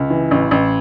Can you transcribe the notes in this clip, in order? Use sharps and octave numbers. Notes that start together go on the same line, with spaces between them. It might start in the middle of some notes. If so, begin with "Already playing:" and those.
Already playing: C#2
E3
A1
A1